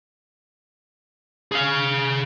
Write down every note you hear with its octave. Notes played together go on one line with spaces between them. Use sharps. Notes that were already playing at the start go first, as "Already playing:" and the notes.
G#4 F5